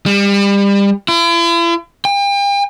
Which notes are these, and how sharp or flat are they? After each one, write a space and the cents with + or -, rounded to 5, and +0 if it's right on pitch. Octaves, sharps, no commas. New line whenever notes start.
G3 +30
E4 +45
G5 +40